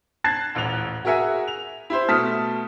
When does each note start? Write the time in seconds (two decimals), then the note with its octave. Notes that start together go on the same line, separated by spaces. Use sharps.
0.24 A5 F#6 G#6 A6 C7
0.55 D#1 A1 F#6 F7
1.05 F#4 G#4 A#4 E5 F#5 G#5
1.48 F7
1.90 E4 G4 C5
2.08 B2 A3 A5 D#6 F6 B6